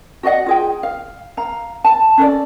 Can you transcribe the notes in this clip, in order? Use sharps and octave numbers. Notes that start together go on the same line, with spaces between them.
F#4 D5 D#5 F#5
F4 G#4 G5
F5
F5 A#5
A5
C#4 A4 D5